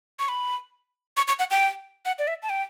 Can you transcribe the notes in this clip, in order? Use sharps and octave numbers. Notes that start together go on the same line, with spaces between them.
C#6
B5
C#6
C#6
F#5
G5
F#5
D5
E5
A5
G5